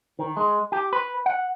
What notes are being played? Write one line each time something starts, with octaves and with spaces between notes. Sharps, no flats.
D#3
G#3
G4
B4
F#5